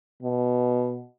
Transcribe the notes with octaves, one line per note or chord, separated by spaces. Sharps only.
B2